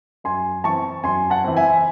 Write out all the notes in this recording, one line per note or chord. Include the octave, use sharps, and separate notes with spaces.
F#2 G#5 C6
E3 C4 A5 C#6
F#2 G#5 C6
F#5 A5
E3 C4
E5 G#5